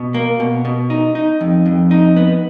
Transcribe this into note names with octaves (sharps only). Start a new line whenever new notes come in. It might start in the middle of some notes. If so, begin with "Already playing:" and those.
Already playing: B2
A#3
B2
B2
D#4
D#4
F2
F2
D#4
B3